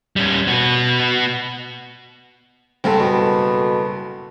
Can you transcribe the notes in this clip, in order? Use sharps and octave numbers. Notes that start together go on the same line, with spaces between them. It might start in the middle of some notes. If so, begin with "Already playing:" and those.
G3 C#4
B3 F#4
F#1 G2 C4 A4
B2